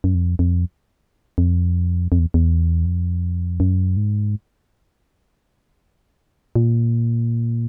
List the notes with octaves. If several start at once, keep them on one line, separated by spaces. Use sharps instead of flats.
F#2
F2
F2
F2
F2
E2
E2
F2
F#2
G#2
A#2